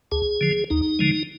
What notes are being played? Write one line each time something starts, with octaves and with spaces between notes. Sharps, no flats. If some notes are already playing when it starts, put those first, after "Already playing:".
D2 G#4
D3 F3
D#2 D#4
D3 F3 G#3